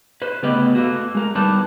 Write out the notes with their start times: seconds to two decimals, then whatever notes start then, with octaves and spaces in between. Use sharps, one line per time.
0.22 B4 C5
0.43 C#3 A3 B3 G4 B4 D#5
0.75 A3 A#3 F#4
1.15 G#3 A#4
1.35 E2 D#3 G3 B4 A5